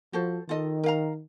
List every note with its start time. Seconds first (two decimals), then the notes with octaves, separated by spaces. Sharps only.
0.13 F3 F#4 A4 C5
0.49 D#3 F4 A4 D#5
0.84 A#4 F5 A#5